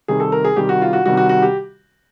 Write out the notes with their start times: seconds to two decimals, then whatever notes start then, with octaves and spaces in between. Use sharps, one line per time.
0.08 C3 D#3 G3 G#4
0.20 A4
0.32 A#4
0.44 G#4
0.56 C3 D#3 G3 G4
0.69 F#4
0.82 F4
0.93 F#4
1.06 C3 D#3 G3 F#4
1.17 F#4
1.29 F#4
1.42 G4